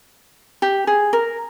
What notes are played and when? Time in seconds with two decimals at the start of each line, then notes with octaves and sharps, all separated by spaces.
0.62 G4
0.87 G#4
1.13 A#4